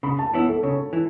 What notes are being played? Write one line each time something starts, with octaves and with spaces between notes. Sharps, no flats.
C#3 B5
A5
E3 B3 E4 C#5
A4
C#3 C#5
E3